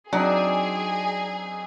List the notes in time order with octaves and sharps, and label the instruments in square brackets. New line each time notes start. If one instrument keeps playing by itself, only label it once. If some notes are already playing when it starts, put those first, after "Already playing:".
[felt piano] F#3 [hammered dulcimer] C4 D#4 F#5 [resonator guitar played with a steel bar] D4 [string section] G#4